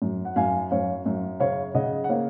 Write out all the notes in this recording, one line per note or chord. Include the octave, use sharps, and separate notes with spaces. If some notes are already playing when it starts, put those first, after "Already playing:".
F#2
F#5
F#2 F5 G#5
F#2 C#5 F5
F#2
C#3 C#5 F5
C#3 D#5 F#5
F#5
A#3 C#5 F5